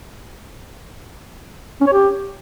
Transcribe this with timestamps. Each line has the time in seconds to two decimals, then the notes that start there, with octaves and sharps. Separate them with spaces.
1.81 C#4
1.87 C#5
1.92 G4